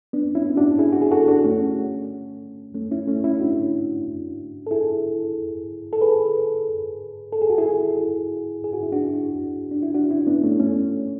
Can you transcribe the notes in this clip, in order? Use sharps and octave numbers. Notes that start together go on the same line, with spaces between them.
B3 D4
C#4 E4
D4 F#4
E4 G#4
F#4
G#4
F#4 A4
D4 F#4
A3 C#4
A3 C#4
C#4 E4
A3 C#4
C#4 E4
D4 F#4
A4
E4 G#4
A4
G#4 B4
A4
G#4
F#4
E4 G#4
G#4
F#4
E4
D4 F#4
D4
E4
D4 F#4
C#4 E4
B3 D4
A3 C#4
A3 C#4